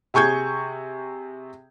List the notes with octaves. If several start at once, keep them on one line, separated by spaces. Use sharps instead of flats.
C3 G#4 C#6 G6 G#6